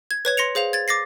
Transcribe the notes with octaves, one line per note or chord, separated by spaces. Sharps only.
G#6
B4 C#5 G#6
C6 A#6 C#7 F7
G#4 C5 F5 F7
G#6 A6
D6 A6 A#6 C7